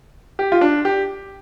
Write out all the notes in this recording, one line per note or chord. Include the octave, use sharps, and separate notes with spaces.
G4
F4
D4
G4